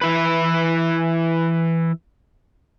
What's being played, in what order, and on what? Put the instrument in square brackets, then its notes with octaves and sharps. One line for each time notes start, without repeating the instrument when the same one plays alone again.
[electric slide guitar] E3 E4 B4